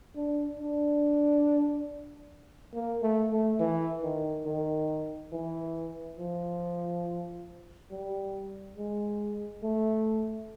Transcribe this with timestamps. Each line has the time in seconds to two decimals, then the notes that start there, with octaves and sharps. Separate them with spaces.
0.16 D4
0.60 D4
2.75 A#3
3.02 A3
3.31 A3
3.60 E3
4.03 D#3
4.46 D#3
5.33 E3
6.18 F3
7.91 G3
8.77 G#3
9.63 A3